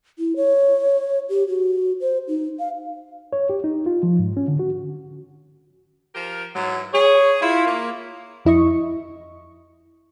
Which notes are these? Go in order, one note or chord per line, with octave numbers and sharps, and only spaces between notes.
E4
C#5
G4
F#4
C5
D#4
F5
C#5
G4
D#4
F4
F3
G#2
C#4
D3
F#4
F3 G4 A#4
G#2 E3 F#3
G#4 C#5
E4 F4
A#3
F2 E4 D#5 C#6